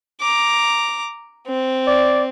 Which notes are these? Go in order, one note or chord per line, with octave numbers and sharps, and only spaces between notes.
A#5 D6
C4
D5